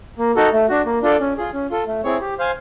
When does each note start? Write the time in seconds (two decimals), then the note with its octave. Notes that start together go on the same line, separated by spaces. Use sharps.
0.18 A#3
0.36 D#4 F#4 A4
0.53 A3
0.69 D4 F#4
0.86 A#3
1.02 D4 F4 A4 D5
1.20 C#4
1.37 F4 G#4
1.53 C#4
1.70 F4 A4
1.87 A3
2.04 C4 E4 G#4 C#5
2.21 G4
2.38 C5 F5 G#5